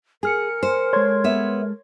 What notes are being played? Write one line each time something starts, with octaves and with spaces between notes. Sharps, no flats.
G#4 A#4 G#5 F6 C#7
C5
G#3 G#4 A4 C#5 C6 G#6
B3 E5